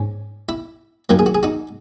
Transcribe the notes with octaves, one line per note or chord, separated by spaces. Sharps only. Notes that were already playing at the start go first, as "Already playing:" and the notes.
Already playing: G#2 C#4
E4
F#2 D#3 F#3 A#3 F#4
G#4
F#4
G#4
D#4 F#4